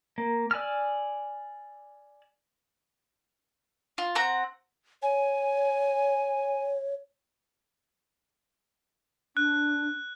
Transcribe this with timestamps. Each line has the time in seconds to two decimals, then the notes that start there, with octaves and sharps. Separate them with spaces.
0.18 A#3
0.51 D5 G#5 E6 F6
3.98 F4
4.15 C4 F#5 A#5
5.02 C#5 G#5
9.37 D4 F#6